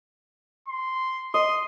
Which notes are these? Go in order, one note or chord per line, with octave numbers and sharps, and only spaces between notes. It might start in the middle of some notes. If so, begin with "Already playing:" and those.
C6
D#5 C6